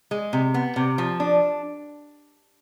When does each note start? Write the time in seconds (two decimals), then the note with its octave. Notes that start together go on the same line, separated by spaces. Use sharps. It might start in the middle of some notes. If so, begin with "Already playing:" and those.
0.11 G#3
0.33 C3
0.54 B3
0.76 C3
0.98 F3
1.20 D4